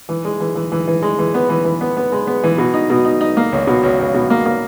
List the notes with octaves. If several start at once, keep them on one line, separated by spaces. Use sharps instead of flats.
E3
G#3
E3
E3
E3
E3
G#3
E3
B3
E3
E3
B3
B3
G#3
B3
E3
B2
D#4
B2
D#4
D#4
A#3
C#2
B2
C#2
C#2
B2
A#3
A#3